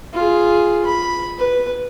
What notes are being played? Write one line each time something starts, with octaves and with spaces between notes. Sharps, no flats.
F4 G#4
B5
B4